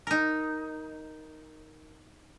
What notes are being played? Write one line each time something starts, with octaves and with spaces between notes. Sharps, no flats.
D#4 A#4